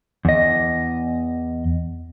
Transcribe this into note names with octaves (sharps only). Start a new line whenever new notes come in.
E2 D#5